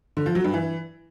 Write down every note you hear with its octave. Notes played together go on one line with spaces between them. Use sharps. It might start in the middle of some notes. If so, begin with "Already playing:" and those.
D3
F3
F#3
G2
E3